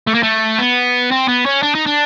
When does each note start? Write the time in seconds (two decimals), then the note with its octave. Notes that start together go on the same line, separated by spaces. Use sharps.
0.07 A3
0.14 A#3
0.23 A3
0.59 B3
1.11 C4
1.28 B3
1.46 C#4
1.63 D4
1.75 D#4
1.86 D4